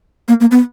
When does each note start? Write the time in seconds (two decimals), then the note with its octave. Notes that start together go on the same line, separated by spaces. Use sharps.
0.28 A#3
0.40 A#3
0.51 B3